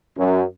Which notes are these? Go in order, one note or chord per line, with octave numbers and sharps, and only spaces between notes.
F#2